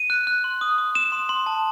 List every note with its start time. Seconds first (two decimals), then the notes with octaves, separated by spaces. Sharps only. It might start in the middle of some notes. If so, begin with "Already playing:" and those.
Already playing: D#7
0.10 F#6
0.27 F#6
0.44 C6
0.61 D#6
0.78 D#6
0.95 D#6 E7
1.12 C6
1.29 C6
1.46 A5